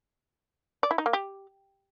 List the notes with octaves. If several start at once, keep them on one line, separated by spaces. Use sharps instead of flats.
D5
E4
D#4
A#3
G4